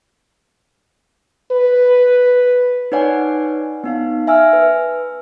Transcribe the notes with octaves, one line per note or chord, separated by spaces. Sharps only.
B4
D#4 B4 C#5 D5 F#5 G#5
B3 D#4 F5
E5 G#5 E6 F6
B4